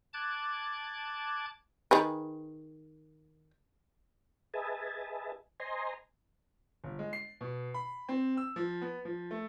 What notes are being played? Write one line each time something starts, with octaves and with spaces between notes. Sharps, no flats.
A5 D6 F#6 G#6
D#3 G#4 B4
G#4 B4 D#5 E5 G#5 A5
C5 D#5 G#5 A#5 C6
G1
G#3
C7
B2
B5
C4
E6
F3
B3
F3
A3